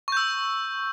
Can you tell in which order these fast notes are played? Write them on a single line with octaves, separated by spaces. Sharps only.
C#6 G6 E6